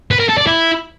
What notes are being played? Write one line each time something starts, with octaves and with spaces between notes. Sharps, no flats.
B4
A#4
A4
D5
E4